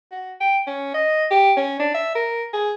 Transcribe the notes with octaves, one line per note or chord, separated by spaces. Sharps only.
F#4
G5
C#4
D#5
G4
C#4
D4
E5
A#4
G#4